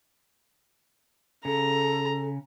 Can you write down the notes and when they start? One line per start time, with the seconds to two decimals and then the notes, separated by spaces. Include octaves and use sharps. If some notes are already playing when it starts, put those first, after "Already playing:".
1.45 C#3 A4 A#5